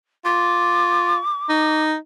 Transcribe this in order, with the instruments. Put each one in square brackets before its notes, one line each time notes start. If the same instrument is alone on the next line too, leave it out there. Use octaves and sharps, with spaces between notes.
[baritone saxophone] F4 [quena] D6
[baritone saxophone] D#4